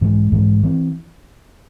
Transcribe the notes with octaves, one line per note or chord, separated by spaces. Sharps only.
G#2 E3 G#3
G#2 E3 G#3
E3 C4